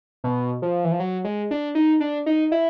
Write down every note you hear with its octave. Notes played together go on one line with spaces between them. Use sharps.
B2
F3
E3
F3
F#3
G#3
D4
D#4
D4
D#4
E4